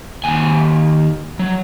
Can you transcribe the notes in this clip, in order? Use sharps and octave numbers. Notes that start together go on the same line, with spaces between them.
D#2 G#5
F#3